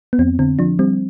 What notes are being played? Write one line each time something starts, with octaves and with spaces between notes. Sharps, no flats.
B3
F2 C4
D3 C4
F3 D4
G3 C4